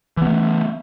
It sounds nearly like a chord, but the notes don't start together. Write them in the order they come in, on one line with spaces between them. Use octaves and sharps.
E3 B3 A3